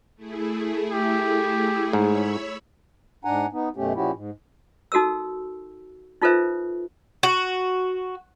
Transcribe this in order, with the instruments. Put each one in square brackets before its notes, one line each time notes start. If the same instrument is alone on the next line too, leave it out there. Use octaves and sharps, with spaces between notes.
[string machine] A3 E4 G#4
[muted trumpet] G4
[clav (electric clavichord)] G#2 [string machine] C#5 B5 E6
[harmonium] G#2 D4 F#5 G#5 A#5
B3 D#4
F#2 B2 A3 C#4 G4
A#2 F3 C#4 E4 F#4 G4
G#2
[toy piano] D#4 F#4 A4 A#4 E6
D#4 F4 A4 B4 C5 E5
[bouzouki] F#4